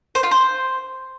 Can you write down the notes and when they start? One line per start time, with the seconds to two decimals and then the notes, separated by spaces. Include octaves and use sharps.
0.15 C5
0.23 F4
0.31 C5